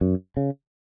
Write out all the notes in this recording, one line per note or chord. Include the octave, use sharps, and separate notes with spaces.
F#2
C#3